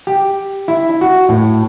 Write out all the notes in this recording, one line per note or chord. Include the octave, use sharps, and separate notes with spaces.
G4
E4
F#4
A2